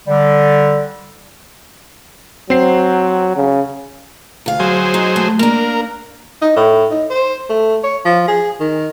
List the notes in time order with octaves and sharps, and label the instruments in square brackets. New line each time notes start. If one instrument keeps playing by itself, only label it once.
[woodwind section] D3 G3
[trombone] F#3 [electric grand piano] C4 C7
[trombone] C#3
[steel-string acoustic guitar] D2 F5
[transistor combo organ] F#3 G#4 C5
[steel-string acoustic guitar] D#4
A3
[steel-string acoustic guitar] A#3 D4 [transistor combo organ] A#4
[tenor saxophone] D#4
A2
D#4
C5
A3
C#5
F3
G#4
D#3